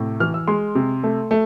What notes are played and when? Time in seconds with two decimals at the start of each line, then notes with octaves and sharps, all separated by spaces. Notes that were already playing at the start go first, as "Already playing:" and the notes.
Already playing: A2 C3
0.20 E3 F6
0.34 E6
0.48 G#3 C6
0.75 C3
1.03 A3
1.31 A3